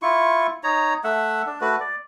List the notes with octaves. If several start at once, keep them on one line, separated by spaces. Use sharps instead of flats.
E4 F4 C#6
D#4 C#5 A#5
A3 E5 F#5
D4
A3 F#4 B4
D5